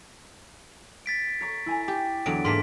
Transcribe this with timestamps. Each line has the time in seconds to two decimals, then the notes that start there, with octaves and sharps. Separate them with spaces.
1.06 A6 B6 D7
1.41 C#5 A#5 C#6
1.66 E4 G#5 A#5
1.88 G4
2.26 E2 D3 F#3 D7
2.45 G#2 E3 A#3 F4 A5 C6 B6